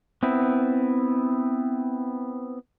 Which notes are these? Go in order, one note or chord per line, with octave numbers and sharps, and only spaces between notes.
B3 C4 E4